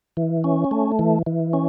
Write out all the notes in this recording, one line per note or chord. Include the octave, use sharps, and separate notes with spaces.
E3
C#4
A3
E3
E3
C#4